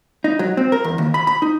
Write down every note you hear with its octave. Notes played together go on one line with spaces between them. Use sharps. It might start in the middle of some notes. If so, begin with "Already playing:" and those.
D#4
F#3
C4
A#4
E2
D#2
B5
B5
D#4